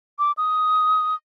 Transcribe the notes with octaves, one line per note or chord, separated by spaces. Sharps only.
D6
D#6